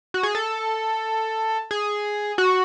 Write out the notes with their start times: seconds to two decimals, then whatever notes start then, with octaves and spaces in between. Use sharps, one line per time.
0.14 F#4
0.23 G#4
0.35 A4
1.71 G#4
2.38 F#4